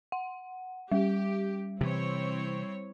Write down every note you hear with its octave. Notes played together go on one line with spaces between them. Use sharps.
F#5
G3 G4
C3 E3 C4 E4 C#5